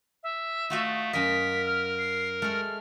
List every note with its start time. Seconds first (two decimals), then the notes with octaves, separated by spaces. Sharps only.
0.23 E5
0.70 A3 F4 F#4 D#5
1.13 F#2 A#4 D#5 B6
1.66 F6
1.98 C7
2.42 G#3 A3 F6